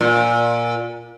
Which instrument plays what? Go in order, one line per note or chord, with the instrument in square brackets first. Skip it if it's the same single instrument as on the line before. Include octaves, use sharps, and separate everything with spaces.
[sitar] A#2